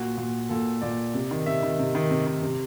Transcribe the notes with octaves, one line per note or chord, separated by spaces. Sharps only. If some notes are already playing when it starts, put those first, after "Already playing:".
Already playing: A#2 F#4
A#2
A#2 A4
A#2 D5
C3
D#3
C3 E5
D#3
C3
D#3
C3
D#3
C3